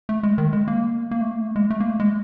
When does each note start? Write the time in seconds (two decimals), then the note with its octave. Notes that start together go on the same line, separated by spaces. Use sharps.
0.09 A3
0.23 G#3
0.38 D#3
0.53 G#3
0.68 A#3
1.11 A#3
1.21 A3
1.31 A#3
1.41 A3
1.56 G#3
1.70 A3
1.80 A#3
1.90 A3
2.00 G#3